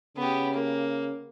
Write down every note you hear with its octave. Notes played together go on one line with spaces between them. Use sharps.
C#3 B3 G4
A#3